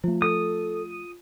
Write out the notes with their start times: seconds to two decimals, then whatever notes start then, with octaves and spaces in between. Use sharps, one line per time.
0.04 F3 A3 F4
0.22 A4 D#6